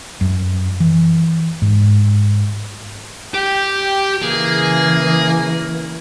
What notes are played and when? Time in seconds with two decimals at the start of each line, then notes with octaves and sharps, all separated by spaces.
0.21 F#2
0.80 E3
1.62 G#2
3.34 G4 G5
4.22 C#3 E3 A#3 G#4